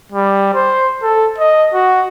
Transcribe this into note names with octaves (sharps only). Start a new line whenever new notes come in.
G3
C5
A4
D#5
F#4